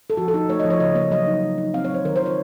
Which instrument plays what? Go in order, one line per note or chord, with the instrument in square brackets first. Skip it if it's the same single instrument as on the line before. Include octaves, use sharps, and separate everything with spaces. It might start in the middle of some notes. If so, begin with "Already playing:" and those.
[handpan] A4
F3 F#4
A4
D#4
A3 C#5
D#5
F3
C#5
C#3 D#5
A#3 C#5
F#3 D#5
D#4
F#3
D#4
C4 F5
C#5
F#3 C5
D#3 A#4
C5
F4
C#5